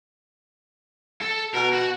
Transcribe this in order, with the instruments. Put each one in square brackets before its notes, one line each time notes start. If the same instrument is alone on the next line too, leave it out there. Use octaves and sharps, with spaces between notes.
[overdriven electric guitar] A4
[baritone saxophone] B2 [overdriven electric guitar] A#4
[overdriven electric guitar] F#4 F#5